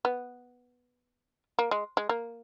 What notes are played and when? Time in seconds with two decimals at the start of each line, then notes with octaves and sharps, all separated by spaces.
0.05 B3
1.59 A#3
1.71 G#3
1.97 G#3
2.09 A#3